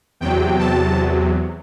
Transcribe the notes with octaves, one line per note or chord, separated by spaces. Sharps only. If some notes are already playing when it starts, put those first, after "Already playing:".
E2 C3 F#3 G5
A5